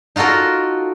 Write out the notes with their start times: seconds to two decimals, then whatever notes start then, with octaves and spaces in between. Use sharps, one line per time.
0.16 D#4 F4 F#4 A4 A#4